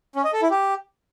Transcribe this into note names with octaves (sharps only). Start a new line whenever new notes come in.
C#4
D#5
A4
E4
G4